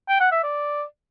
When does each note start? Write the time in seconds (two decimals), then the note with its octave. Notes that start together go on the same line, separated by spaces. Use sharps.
0.09 G5
0.20 F#5
0.32 E5
0.44 D5